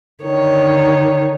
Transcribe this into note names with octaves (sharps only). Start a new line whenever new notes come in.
D3 D#3 C#5